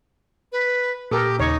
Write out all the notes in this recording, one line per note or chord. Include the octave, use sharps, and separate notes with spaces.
B4
A#2 A#3 G4 A4 A#4 D#6
D#2 C#3 D#4 C#5